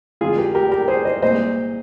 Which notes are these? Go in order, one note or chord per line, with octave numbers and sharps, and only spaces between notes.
F2 D3 G#3 F4 G#4
G4 A#4
G4 A#4
G4 A#4
G#4 C5
C5 D#5
C2 A#2 G#3 C5 D#5